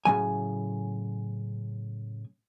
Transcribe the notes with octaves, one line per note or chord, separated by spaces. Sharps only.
A2 C#3 F#3 G#5